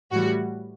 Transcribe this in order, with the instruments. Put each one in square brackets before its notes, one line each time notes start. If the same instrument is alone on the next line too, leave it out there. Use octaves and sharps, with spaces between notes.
[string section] A2 E3 G3 F#4